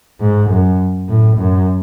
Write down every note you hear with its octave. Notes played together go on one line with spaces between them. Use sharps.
G#2
F#2
A2
F#2